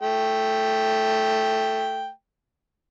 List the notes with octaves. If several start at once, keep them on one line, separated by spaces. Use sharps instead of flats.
A3 G5